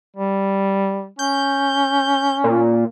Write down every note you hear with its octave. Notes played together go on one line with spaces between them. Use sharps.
G3
C#4 G6
A#2